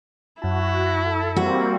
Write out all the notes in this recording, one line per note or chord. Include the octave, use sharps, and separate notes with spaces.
F#2 E4 F#4 A5
A4
G3 A#3 C4 F#4